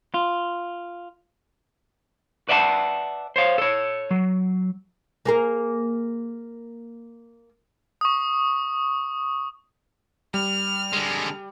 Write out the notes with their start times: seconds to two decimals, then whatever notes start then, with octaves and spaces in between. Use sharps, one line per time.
0.14 F4
2.49 B4 D5 E5 F#5 G5 A5
3.36 C5 C#5 F5
3.58 A4 C#5
4.11 F#3
5.25 A#3 G#4 A#4
8.01 C#6 D#6
10.34 G3 F6
10.93 D3 G#3